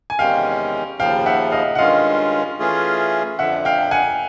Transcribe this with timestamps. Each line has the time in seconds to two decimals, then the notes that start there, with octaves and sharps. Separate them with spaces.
0.10 G#5
0.19 E2 C3 D#3 G#3 C#4 F5 G5
0.99 D#2 C#3 F3 F5 G5
1.26 E5 F#5
1.52 D#5 F5
1.75 F#5
1.78 G2 D#3 G#3 C#4 F4 D#5 F5
2.59 E3 A3 C#4 F4 G#4
3.39 F2 D3 F3 E5 F#5
3.65 F5 G5
3.91 F#5 G#5